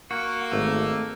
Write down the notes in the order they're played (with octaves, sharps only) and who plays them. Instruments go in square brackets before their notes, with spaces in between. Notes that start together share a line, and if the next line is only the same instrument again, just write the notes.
[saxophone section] A#3 [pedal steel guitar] F#4
[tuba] G#1 [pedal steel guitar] A3